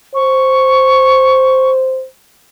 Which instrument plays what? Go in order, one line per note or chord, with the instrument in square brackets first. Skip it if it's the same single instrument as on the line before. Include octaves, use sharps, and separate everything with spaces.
[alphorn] C5 [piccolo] C#6